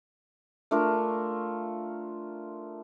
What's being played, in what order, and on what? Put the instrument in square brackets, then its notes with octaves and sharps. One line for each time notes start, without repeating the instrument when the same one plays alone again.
[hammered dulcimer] A3 D4 F4 A#4